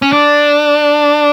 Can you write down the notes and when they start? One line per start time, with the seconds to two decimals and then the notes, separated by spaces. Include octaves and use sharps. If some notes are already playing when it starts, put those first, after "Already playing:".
0.02 C#4
0.13 D4